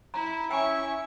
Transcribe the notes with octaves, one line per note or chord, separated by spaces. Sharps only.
E4 A#5
C#4 E4 C#5 E5 G5 G#5 C#6